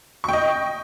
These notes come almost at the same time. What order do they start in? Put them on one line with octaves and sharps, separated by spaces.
C#6 G5 D#5